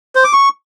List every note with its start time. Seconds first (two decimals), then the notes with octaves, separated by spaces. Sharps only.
0.15 C5
0.24 D6
0.33 C#6